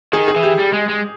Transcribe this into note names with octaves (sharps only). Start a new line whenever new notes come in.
D#3 G#4
G#4
E3
G4
G3
G#3
G#3